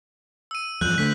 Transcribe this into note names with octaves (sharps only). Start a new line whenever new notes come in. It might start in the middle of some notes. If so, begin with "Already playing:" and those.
E6 D#7
E2 G2 F3 F#6 G6 F#7
D3 A3 B6